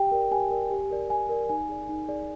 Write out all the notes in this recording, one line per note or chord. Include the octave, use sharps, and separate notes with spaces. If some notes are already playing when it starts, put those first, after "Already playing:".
Already playing: G4 G5
A#4 D5
G4 G#5
A#4 D5
G4
A#4 D5
G4 G#5
A#4 D5
D#4 G#5
G#4 D5
D#4
G#4 D5